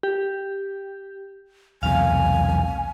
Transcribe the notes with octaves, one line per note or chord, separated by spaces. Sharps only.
G4
B1 E2 C3 F5 G#5